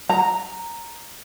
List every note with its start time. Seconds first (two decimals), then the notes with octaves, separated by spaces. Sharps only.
0.09 A#5